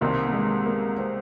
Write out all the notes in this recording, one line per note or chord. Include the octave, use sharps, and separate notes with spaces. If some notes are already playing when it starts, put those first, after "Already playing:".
C2 C3 D#3 A#3 C4
A#3
G#3
A#3
C4